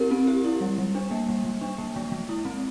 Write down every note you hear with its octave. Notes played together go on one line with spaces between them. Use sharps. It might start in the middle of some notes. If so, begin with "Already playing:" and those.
Already playing: C4 E4 G4 A#4
C4
G4
E4
G3
G3
D4
A#3
G3
G3
D4
A#3
G#3
G#3
E4
C4